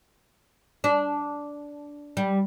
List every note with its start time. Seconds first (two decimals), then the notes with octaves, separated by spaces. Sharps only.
0.84 D4
2.17 G3